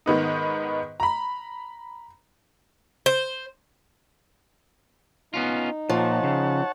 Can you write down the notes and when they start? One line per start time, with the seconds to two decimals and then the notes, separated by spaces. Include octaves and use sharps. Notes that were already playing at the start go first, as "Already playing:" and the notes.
0.06 G#2 D#3 B3 D#4
1.00 A#5 B5
3.06 C5
5.34 B3 C#4 D#4 F4
5.90 A#2 F3 C#5 F#5 A5
6.24 C#3